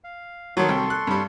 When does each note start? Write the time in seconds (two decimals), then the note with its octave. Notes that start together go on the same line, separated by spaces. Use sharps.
0.04 F5
0.57 D#3 F#3 A4 C6 C#6
0.69 C2 G5
0.90 F#6
1.07 G2 G3